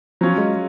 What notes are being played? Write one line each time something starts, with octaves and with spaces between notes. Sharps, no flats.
F3 F#3 C#4 F4
G#3